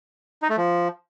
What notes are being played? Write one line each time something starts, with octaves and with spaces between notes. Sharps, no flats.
D#4
A3
F3